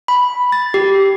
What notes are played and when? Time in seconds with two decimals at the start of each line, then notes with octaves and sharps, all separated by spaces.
0.08 B5
0.52 A6
0.74 G4